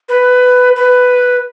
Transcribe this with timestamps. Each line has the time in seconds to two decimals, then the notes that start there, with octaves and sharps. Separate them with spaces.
0.09 B4
0.76 B4